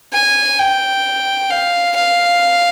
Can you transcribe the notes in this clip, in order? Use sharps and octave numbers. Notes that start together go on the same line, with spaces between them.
G#5
G5
F5
F5